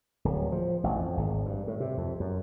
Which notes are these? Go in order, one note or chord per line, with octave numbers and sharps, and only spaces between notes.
D1
F3
A1
F2
G#1
G2
A2
C3
F2
F#2